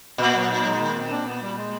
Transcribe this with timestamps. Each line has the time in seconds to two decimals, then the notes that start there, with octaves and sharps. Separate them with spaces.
0.18 A#2 B3
0.34 F#3
0.50 D#4
0.65 G#3
0.80 D#3
0.95 C4
1.11 D4
1.26 B3
1.41 G3
1.57 G#3